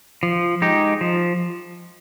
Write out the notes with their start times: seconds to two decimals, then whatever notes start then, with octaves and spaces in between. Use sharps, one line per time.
0.23 F3
0.62 G#3 D#4 G4
1.01 F3